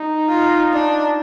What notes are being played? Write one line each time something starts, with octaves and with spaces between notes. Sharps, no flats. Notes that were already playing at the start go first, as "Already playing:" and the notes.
Already playing: D#4
F4
D4